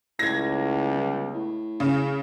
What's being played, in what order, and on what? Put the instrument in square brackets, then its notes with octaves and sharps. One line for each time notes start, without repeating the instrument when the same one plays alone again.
[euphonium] C#2 [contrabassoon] A2 [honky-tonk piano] G#6 A#6
[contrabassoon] G1
A2
[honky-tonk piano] C#3 [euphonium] G#4